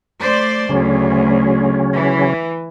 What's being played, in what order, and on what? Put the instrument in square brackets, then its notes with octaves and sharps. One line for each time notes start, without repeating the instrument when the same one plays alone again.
[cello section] A3 C5 D5
[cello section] D2 [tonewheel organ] C#3 F#3 C#4
[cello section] E3